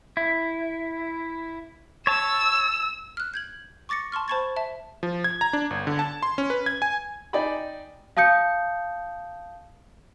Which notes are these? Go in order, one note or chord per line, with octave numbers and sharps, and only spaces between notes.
E4
C#5 A5 E6
F6 F#6
G6 G#6 F#7
C#6 D6 A6 A#6 C#7
A5 C6 C#6 F6
C5 A5 B5 C#6 G#6 A6
E5 A5
F3
G#6
A#5
D4
G1
D3
A5
C6
C#4
B4
G#6
G#5
D#4 D5 D#5 G5 G#5 B5
F5 A5 D#6 G6 C#7